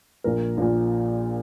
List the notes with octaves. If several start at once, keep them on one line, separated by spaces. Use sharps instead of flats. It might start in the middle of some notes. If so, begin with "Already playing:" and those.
A#1 A#2 F3 A#4
A#1 A#2 F3